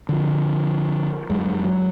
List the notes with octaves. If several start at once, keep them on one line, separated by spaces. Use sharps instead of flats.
D3 F3
F#2 G#3
F#3